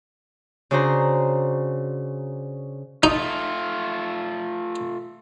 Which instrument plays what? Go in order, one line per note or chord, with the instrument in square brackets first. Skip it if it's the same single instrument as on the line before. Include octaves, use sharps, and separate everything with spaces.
[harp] C#3 D4 F#4 C5 A#5
[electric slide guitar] A3 F4 [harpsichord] D#4